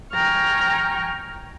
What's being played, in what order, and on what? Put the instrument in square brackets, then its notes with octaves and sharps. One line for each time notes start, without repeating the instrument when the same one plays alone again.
[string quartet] G5 G#5 A#5 C#6 F6